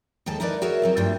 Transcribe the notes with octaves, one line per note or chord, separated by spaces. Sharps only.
D#2 D#3 G#3 A4 A5
D#4 E4 A#4 B4 D5
F#4 G#4 A#4 C#5 E5
F#3 C4 E4
G2 G3 A3 D4 F4 G5